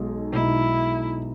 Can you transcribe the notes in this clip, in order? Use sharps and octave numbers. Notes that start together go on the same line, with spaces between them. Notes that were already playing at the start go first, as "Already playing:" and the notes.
Already playing: B1 B2 G#3 D#4
B1 B2 G#3 D#4 E4